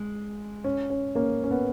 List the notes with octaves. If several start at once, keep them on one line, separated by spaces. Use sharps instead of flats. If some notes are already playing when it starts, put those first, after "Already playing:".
Already playing: G#3
C#4
C#4
A#3 C#4
C#4
B3